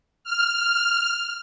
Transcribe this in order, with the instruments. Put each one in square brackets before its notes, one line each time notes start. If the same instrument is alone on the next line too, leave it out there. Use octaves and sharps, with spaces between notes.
[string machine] F6